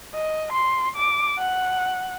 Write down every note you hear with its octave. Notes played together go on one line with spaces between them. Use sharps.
D#5
C6
D6
F#5